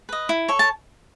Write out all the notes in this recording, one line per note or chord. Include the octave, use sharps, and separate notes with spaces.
B4 D#5
E4
A4 C#5
A5